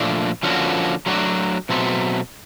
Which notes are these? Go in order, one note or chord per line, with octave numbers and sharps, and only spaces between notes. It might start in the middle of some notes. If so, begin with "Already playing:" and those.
Already playing: A#2 F3 A3 D4
D3 F3 A#3 C#4 F#4
F#3 A3 D4 F#4
B2 F#3 A3 C4